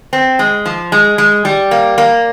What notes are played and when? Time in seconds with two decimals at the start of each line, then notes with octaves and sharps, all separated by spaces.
0.13 C4
0.39 G#3
0.65 F3
0.92 G#3
1.18 G#3
1.45 G3
1.71 A#3
1.98 A#3